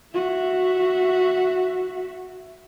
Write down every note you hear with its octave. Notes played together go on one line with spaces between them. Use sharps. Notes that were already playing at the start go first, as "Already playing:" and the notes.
F#4 E5